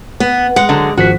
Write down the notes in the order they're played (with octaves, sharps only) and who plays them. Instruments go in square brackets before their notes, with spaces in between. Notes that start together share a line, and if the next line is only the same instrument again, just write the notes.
[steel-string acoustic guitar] B3
[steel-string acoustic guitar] G#3 [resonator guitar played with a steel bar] F#5
[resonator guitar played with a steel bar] D3 F#3
[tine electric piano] G#1 F3 B6 [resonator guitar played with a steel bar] F#4